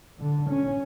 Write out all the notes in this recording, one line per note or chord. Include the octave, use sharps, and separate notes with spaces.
D3
C#4